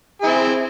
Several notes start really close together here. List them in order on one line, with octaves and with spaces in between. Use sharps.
G#4 E4 C4